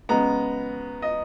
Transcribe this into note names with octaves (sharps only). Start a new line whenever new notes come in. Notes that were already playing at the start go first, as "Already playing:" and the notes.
C#3 G#3 B3 A#5
D#5